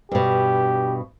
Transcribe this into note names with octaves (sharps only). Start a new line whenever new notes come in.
G2 B2 G4